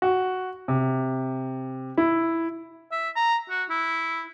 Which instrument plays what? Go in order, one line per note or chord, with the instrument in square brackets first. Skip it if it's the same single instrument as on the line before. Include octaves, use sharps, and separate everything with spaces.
[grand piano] F#4
C3
E4
[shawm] E5
A#5
F#4
E4